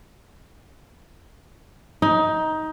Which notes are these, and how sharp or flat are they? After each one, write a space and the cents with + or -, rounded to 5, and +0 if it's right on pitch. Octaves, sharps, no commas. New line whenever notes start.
D#4 +15